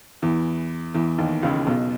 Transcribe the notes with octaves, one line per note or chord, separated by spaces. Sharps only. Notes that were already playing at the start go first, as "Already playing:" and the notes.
E2 E3
E2 E3
D#2 D#3
C#2 C#3
B1 B2